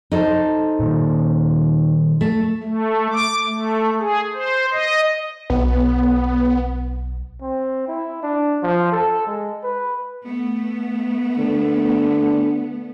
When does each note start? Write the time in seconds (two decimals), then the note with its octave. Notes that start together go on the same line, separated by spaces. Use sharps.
0.12 D#4 A4 C5
0.80 A#2 D#3 A#3
2.21 A3
2.63 A3
3.12 D6
3.47 A3
3.99 G#4
4.34 C5
4.73 D#5
5.50 B1 B3
7.42 C4
7.88 E4
8.23 D4
8.63 F3
8.92 A4
9.27 G#3
9.64 B4
10.26 A3 B3
11.39 D3